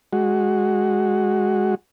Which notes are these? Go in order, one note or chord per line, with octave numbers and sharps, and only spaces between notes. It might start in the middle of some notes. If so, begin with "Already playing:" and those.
G#3 F#4